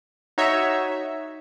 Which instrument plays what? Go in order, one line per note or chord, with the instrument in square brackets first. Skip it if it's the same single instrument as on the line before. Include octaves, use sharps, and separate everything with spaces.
[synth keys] D#4 F#4 C#5 E5